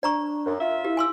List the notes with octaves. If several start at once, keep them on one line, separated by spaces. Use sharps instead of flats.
D4 D5 A#5 C#6
F#2
F4 E5
E4 G4
G#5 C6 E6